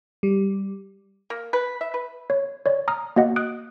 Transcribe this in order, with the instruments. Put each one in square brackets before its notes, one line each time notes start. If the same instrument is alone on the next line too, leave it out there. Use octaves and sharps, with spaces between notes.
[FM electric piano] G3
[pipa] A#3
B4
E5
B4
[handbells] C#5
C#5 D5
A#5 D#6 F6
A#3 F#4 D#5 F#5
D#6 F#6 D7